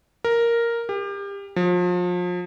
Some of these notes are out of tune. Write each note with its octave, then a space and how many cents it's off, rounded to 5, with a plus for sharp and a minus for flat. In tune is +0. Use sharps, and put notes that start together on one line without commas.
A#4 +0
G4 +30
F3 +35